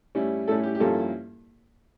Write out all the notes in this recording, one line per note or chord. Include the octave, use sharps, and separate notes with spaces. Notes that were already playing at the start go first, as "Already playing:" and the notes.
A2 G3 C#4 E4
A2 G3 C#4 E4 A4
G4
G4
G2 F3 A#3 C#4 E4 A4